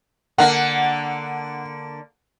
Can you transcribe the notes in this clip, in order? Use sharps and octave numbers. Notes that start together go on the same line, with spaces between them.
D3 A#3 F#5